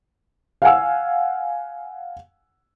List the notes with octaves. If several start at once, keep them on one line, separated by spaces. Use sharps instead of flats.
F5 F#5 G#5 E6